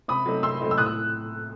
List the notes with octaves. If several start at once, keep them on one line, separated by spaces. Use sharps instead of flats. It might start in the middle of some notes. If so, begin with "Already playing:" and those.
C3 B5 D#6
F#3 A3 C4 D#4
C3 C6 E6
F#3 A3 C4 D#4
E6
A2 D#6 F#6
E6